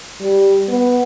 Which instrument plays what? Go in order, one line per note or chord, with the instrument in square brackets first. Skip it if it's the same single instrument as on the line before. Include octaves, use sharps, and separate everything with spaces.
[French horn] G3
B3